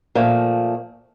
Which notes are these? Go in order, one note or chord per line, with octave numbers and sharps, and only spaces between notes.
A#2 F3 A3